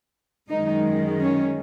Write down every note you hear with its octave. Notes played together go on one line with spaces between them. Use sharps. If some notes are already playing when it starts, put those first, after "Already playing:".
F#2 D#3 G#3 D#4
C#4